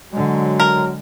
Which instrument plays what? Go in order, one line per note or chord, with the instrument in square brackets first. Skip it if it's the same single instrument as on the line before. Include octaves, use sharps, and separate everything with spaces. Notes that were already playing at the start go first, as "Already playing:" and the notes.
[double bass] D3 G#3 [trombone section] F#3
[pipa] A#4